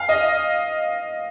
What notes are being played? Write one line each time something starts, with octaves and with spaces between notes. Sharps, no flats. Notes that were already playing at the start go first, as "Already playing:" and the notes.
Already playing: F5
D#5